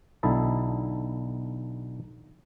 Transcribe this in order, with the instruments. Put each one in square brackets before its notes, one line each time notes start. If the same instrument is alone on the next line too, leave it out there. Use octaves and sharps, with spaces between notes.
[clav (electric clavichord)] B1 D3 D#4 E4 E5 A5